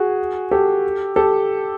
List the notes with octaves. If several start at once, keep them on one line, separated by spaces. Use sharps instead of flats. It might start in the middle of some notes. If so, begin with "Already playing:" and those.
Already playing: F#4 G#4
G4 A4
G4 A4